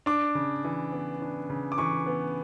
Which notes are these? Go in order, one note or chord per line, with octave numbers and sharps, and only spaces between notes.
D4 D6
C#3
E3
B3
D4
C#3
D6
E3 C#6
B3